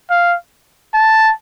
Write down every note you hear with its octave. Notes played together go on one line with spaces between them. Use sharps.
F5
A5